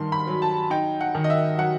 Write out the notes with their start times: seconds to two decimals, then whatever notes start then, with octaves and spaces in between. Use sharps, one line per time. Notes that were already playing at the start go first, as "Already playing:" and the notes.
Already playing: G2 D#3 C6
0.12 B5
0.27 F#3
0.42 A5
0.70 D#4 G5
1.01 F#5
1.15 D#3
1.24 D#5
1.30 E5
1.58 F#3 F#5